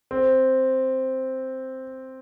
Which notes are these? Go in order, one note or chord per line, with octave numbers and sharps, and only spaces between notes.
C4